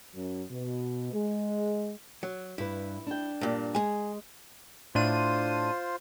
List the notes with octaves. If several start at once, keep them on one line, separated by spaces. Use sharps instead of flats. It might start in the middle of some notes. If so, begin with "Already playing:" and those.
F#2
B2
G#3
F#3
G2 E4 B4
D4 G5
G2 A#2
G#3 G#4 G#5
A2 D4 F4 C5 D#7